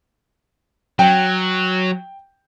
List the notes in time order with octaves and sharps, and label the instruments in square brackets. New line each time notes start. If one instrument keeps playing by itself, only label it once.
[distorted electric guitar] F#3 [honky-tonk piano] G5